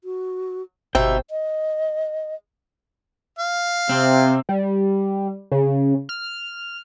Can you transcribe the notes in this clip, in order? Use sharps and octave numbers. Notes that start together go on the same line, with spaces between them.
F#4
G1 B2 D#4 G4 C5 E5 G5
D#5
F5
C3 C4
G3
C#3
F6